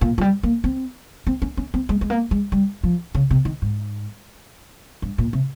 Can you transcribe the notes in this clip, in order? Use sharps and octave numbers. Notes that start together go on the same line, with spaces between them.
A#2
F3
G3
A#3
C4
C4
C#4
C#4
C4
G#3
G#3
A#3
G#3
G3
F3
C#3
C3
D#3
G#2
G2
A#2
C3